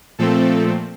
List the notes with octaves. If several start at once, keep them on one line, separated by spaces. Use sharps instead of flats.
A#2 F3 A3 C4 A4